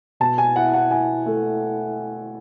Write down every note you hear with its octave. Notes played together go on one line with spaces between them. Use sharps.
B2 A5
G#5
E4 F#5
F#5
E4 G#5
A3